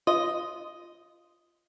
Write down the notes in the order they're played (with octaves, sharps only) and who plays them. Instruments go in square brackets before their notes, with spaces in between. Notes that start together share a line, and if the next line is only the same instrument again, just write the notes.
[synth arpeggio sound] F4 [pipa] D#5